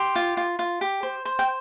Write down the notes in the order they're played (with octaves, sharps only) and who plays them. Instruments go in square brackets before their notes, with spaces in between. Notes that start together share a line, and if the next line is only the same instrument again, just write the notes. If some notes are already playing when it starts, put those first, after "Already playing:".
Already playing: [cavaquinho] G4 C6
F4
F4
F4
G4
C5
C5
G5